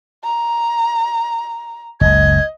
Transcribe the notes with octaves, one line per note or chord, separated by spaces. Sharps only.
A#5
F#1 C#2 D#5 G#6